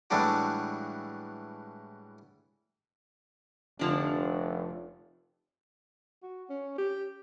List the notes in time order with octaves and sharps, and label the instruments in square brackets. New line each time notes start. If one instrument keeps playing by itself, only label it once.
[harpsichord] A2 E3 G3 G#3 D4 F#4
[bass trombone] F1 [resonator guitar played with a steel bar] D3 F3 D4
[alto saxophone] F#4
C#4
G4